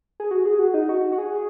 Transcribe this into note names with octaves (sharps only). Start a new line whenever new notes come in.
G#4
F#4
G#4
F#4
D#4
F#4
F#4
G#4